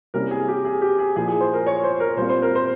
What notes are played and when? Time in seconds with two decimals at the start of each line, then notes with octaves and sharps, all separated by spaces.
0.14 C3 G3 A#3 C#4 E4 A#4
0.31 G#4
0.48 G4
0.65 G#4
0.82 G4
0.99 G#4
1.16 A#2 F3 A#3 E4 G#4
1.28 G#4
1.40 C5
1.53 A#4
1.67 C#5
1.83 C5
2.00 A#4
2.17 A#2 G3 C4 F4 C5
2.29 C5
2.42 A#4
2.55 C5